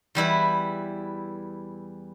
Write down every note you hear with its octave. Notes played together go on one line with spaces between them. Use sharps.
E2 G3 E4 B4